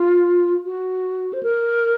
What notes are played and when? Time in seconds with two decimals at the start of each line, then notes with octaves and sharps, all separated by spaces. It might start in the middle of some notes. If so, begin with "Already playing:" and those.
Already playing: F4
0.65 F#4
1.33 C5
1.43 A#4